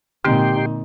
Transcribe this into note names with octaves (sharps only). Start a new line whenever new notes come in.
A#2 D3 G#3 C4 D#4 G4 G5 C6